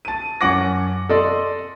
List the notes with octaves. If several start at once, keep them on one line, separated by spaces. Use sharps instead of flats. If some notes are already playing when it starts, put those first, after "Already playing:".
A5 D#7
F#2 C#4 F#5 D6 A#6
A4 D5 D#5 C6